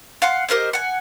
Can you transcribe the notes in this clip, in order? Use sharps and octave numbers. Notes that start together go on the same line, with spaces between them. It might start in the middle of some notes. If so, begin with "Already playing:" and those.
F5 F#5 C6
G4 A#4 C5 D#5
F#5 G#5